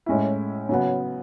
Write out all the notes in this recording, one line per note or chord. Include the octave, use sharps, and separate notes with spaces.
A2 G#3 C#4 E4
C#3 F#3 B3